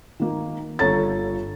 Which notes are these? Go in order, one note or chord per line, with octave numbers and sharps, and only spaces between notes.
D#3 A#3
G1 F4 A4 C#5 A#5 A6